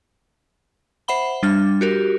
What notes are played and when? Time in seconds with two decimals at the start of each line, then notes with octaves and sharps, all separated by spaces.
1.08 C5 E5 F#5 B5 G7
1.43 G3 D4 F6
1.81 F#4 G4 A#4